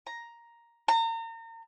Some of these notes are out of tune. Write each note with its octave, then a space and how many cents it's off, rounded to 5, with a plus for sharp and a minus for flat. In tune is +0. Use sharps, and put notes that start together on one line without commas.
A#5 +5
A#5 -35